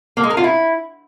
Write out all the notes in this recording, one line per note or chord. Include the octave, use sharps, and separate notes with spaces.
A#3
G#3
A#4
F4
E4